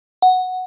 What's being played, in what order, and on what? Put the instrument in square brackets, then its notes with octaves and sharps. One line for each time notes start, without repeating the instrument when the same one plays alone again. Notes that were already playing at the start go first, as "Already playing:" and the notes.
[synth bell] F#5